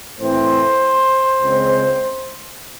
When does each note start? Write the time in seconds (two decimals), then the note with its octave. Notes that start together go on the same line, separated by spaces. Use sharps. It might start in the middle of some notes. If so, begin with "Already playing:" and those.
0.18 A2 E3 C4 C5
1.41 C#2 C#3 G#3 C4